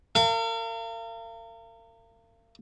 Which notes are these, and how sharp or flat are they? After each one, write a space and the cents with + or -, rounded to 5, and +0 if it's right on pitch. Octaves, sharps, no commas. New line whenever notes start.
A#4 -40 F5 -35